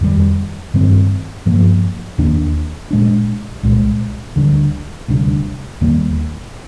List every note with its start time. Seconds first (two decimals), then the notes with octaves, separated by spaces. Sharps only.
0.01 F2 D#3 G3
0.74 G2 D#3 G3 C4
1.46 G2 F3 A#3
2.18 D#2 D#3 A#3 D4
2.91 A#2 G#3 D4
3.63 C2 A#2 G#3
4.36 D2 D3 G3 D4
5.08 D2 C3 G3 D4
5.81 D#2 D#3 G3 A#3